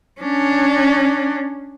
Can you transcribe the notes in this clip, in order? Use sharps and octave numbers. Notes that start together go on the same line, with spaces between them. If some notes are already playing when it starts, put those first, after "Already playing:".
C#4 D4